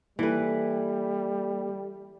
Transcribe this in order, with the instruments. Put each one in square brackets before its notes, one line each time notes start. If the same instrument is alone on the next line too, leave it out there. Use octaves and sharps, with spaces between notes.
[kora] E3 B4 [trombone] G3 [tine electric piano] A#3 A4